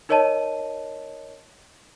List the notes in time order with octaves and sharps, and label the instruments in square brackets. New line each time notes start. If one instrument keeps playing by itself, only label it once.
[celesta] D#4 A#4 C#5 D#5 A5 D#7